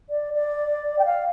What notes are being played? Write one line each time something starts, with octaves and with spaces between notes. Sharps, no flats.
D5
D5
G5
F5